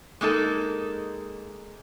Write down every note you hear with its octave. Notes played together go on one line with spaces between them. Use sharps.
G#3 A#3 D#4 A4